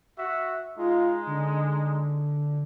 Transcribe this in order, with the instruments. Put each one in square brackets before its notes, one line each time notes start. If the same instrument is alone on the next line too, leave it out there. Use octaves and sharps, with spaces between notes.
[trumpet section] F#4 E5
[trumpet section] G#3 D#4 [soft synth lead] F4
[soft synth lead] D3